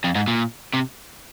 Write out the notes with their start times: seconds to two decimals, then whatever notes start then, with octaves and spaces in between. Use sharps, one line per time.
0.04 F2
0.15 G#2
0.28 A#2
0.74 C3